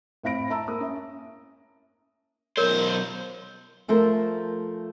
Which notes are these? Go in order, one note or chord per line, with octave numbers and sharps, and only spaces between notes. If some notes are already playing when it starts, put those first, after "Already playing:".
A2 C4 F5 B5 A#6 D7
E5 A5 A#5 E6
A#3 D#6
C#4 E5
B1 A#4 C5 C#5
F3 A3 A4 A#4 C5